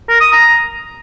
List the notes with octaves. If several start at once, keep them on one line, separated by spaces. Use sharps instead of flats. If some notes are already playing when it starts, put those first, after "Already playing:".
A#4
D#6
A#5